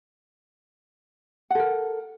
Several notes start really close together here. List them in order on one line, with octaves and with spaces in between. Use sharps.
F#5 A4 A#4